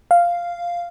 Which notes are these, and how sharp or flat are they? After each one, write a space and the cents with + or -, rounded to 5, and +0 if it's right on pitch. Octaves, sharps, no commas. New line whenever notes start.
F5 -5